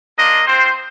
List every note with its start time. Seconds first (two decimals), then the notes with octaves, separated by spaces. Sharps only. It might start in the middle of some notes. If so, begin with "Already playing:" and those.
0.17 A#3 D4 F4 D#5
0.46 C4 F4 C5